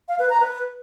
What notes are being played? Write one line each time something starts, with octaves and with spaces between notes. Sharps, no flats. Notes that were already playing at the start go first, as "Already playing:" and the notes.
F5
B4
A#5
B4